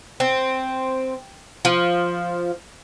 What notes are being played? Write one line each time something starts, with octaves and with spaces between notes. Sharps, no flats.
C4
F3